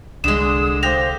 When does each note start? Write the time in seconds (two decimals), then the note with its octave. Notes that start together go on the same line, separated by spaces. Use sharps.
0.24 C2 D3 G#3 G#4 D#6 E7
0.83 G4 C5 F5 A#6 F7